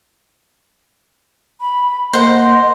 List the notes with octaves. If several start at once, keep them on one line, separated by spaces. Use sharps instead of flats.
B5
A#3 A#4 C5 D#5 F#5